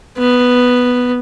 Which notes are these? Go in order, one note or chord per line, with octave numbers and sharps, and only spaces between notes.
B3